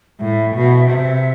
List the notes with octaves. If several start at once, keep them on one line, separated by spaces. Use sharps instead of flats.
A2 E5
B2
C3